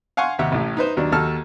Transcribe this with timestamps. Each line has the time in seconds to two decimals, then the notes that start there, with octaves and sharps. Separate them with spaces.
0.17 F5 F#5 G#5 C6 C#6
0.39 D#2 C3 G4 E5 F#5
0.52 A1 A2
0.77 D#4 B4 C5
0.97 D#2 F#3 D4
1.12 D#2 F#4 A4 A5 F6